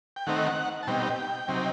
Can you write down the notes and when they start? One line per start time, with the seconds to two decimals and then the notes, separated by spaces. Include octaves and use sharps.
0.16 G5
0.27 D#3 A3 C4 D#4 F#5
0.83 A5
0.87 B2 G3 C4 D#4 G5
1.48 C3 F#3 C4 D#4